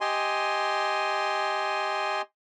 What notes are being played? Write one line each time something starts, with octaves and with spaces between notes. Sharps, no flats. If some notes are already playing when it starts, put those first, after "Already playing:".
G4 D#5 G#5 C6